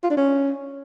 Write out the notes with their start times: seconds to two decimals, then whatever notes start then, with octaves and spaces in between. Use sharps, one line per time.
0.04 F4
0.10 D4
0.17 C#4